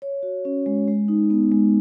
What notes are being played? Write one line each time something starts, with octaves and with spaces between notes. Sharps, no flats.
C#5
F#4
C#4
G#3
G#3
D#4
B3
G#3